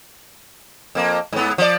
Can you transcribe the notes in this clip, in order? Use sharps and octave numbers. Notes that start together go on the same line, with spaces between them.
F2 A#3
G#2 B3
F3 D5